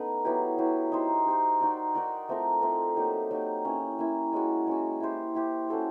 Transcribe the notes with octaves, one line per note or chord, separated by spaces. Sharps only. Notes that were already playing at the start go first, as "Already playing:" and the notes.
Already playing: A3 B3 C#4 D#4 B4
F#3 B3 E4 G4
F#3 B3 E4 G4
D#4 G4 C5
D#4 G4 C5
D#4 F#4 A#4 D5
D#4 F#4 A#4 D5
A3 C4 F4 A#4
A3 C4 F4 A#4
F#3 A#3 D#4 G4
F#3 A#3 D#4 G4
A#3 C#4 E4
A#3 C#4 E4
G#3 C#4 F#4
G#3 C#4 F#4
E4 G4 C5
E4 G4 C5
C#4 F#4 A4 C5